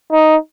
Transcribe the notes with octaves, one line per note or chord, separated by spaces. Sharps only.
D#4